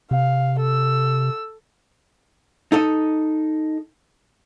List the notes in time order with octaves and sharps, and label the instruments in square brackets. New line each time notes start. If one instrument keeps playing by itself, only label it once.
[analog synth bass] C3 [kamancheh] F5
[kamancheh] A4 E6
[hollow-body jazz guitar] D#4 A4 D#5